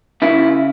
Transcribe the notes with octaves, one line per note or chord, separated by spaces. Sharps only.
C#3 E4